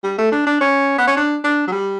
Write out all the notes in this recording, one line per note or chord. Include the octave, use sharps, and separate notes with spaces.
G3
A3
D4
D4
C#4
B3
C#4
D4
D4
F#3
G3